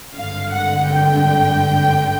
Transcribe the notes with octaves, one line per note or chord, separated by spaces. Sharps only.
G#1 G2 D3 F5
F#5
G5